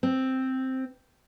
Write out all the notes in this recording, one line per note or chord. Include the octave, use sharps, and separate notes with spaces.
C4